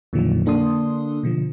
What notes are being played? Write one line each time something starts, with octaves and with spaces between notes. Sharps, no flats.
F2 A#2 D3 D#3 F3 F#3
D3 A#3 D4 A4 C6 D#6
B2 D3 F3